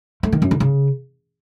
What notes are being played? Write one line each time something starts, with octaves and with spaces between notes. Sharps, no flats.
A3
D#3
F#2
D3
C#3